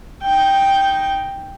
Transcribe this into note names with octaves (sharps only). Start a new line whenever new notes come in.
D#4 G5